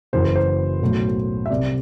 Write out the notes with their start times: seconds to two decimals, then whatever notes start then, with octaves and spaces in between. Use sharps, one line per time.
0.13 F#1 F#2 E3 C5
0.24 B4
0.36 C5
0.81 B1 A2 F#3
1.46 E5
1.50 C2 C3 G3 D5